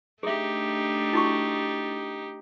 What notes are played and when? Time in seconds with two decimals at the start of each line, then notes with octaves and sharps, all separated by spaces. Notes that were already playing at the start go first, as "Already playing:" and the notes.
0.23 A3 D4 D#4 G4 G#4 E5
1.13 E4 F#4 C#6